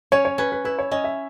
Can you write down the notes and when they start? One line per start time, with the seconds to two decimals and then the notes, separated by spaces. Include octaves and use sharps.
0.12 C#4 C#5
0.25 C#5
0.38 C#4 B4
0.52 B4
0.65 E4 B4
0.79 C#5
0.91 C#4 D#5
1.04 E5